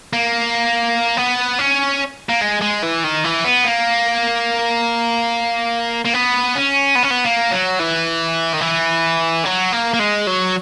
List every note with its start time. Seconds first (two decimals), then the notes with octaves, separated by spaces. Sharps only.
0.13 A#3
1.17 B3
1.59 C#4
2.30 A#3
2.42 G#3
2.62 G#3
2.83 E3
3.04 D#3
3.24 E3
3.44 B3
3.65 A#3
6.05 A#3
6.13 B3
6.55 C#4
6.96 B3
7.03 C#4
7.11 B3
7.24 A#3
7.51 F#3
7.79 E3
8.54 D#3
8.61 E3
9.44 F#3
9.72 A#3
9.94 A#3
9.99 G#3
10.27 F#3